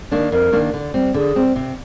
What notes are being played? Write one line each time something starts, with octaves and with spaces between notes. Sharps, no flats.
D#3 A#3 D4
F2 A#4
D#3 A#3 D4
D3
G3 C4
D3 G#4
G3 C4
C3